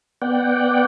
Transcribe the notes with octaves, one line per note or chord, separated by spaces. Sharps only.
B3 D5 F#5 G5